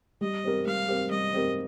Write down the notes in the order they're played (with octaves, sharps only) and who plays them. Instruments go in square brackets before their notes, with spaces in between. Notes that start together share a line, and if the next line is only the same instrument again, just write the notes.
[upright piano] G3 [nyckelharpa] D#5
[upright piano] C4 G4 A#4
[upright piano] G3 [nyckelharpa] F5
[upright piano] C4 G4 A#4
[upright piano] G3 [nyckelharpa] D#5
[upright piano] C4 G4 A#4